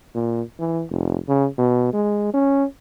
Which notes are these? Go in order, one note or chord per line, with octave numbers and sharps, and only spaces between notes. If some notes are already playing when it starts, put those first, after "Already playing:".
A#2
E3
F1
C#3
B2
G#3
C#4